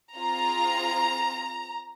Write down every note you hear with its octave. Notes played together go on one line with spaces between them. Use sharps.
C4 F4 G#4 A#5